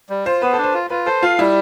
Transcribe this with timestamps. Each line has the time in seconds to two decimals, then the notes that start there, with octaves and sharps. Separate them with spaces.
0.10 G3
0.26 F4 C5
0.42 B3 B4
0.53 A4
0.58 D4
0.63 C5
0.74 F4
0.90 F4 B4
1.06 A4 C5
1.22 F4 F5
1.39 G3 E4